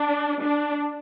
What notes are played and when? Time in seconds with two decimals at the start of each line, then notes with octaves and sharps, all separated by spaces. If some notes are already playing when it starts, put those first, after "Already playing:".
Already playing: D4
0.43 D4